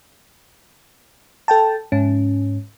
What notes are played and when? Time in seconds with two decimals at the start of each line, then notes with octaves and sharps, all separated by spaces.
1.48 A4 G5 A5
1.92 G#2 C#4